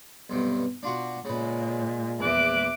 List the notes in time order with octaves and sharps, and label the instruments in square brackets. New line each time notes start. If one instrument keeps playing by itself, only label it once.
[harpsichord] B1 G2 C3
[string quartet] B2 [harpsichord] D4 F4 F#4
[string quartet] A#2 G#3 [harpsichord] C#3 B4
[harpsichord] A#1 E2 [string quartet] E5 D6 F#6